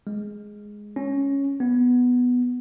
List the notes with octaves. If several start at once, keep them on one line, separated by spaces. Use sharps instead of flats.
G#3
C#4
B3